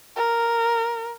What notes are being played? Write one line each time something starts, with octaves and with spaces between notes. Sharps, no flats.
A#4